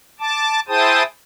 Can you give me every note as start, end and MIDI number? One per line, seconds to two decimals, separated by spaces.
0.20 0.60 81
0.20 0.60 86
0.68 1.03 64
0.68 1.03 68
0.68 1.03 72
0.68 1.03 79
0.68 1.03 81
0.68 1.03 87